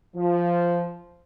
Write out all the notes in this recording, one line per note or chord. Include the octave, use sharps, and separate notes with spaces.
F3